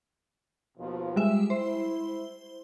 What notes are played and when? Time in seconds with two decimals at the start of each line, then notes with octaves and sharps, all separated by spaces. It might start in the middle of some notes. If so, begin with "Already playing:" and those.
0.78 D#2 B2 F3
1.16 G3 G#3 E5
1.50 E4 C5